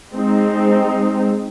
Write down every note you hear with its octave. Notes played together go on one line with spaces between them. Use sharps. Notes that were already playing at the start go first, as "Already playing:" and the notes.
G#3 C4 D#4